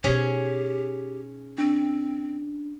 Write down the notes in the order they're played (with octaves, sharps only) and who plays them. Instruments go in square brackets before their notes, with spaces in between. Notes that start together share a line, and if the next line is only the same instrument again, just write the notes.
[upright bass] B2 D#4 [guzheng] C#4 G#4 [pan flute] G4
[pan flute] C4 [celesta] D4